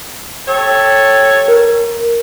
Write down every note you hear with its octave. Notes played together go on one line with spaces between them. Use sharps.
G4 A4 C#5
A#4